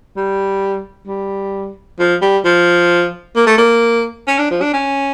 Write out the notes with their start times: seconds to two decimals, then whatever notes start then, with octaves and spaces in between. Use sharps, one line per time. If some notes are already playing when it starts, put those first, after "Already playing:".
0.17 G3
1.08 G3
1.99 F3
2.22 G3
2.45 F3
3.36 A#3
3.47 A3
3.58 A#3
4.28 C#4
4.39 D4
4.51 F3
4.62 D4
4.73 C#4